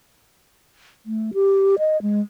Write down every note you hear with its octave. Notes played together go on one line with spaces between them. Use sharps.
A3
G4
D#5
G#3